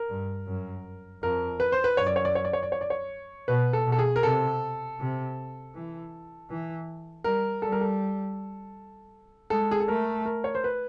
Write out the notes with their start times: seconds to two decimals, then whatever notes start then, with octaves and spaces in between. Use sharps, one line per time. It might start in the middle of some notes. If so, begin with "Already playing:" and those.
Already playing: A#4
0.09 G2
0.47 F#2
1.23 F2 A#4
1.60 B4
1.72 C5
1.84 B4
1.97 F#2 C#5
2.07 D5
2.16 C#5
2.25 D5
2.35 C#5
2.45 D5
2.53 C#5
2.63 D5
2.72 C#5
2.81 D5
2.90 C#5
3.48 B2 B4
3.73 A4
3.86 B2
3.92 A4
3.99 G#4
4.16 A#4
4.23 C3 A4
4.99 C3
5.74 E3
6.50 E3
7.24 G3 A#4
7.62 G3 A4
7.72 A#4
7.81 A4
9.50 G#3 A4
9.71 G#4
9.80 A4
9.88 A3 A#4
10.26 A#4
10.44 C#5
10.55 C5
10.64 B4